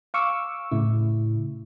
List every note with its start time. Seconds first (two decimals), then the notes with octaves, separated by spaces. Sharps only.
0.14 F5 C#6 D6 E6
0.72 A2 C#3 E4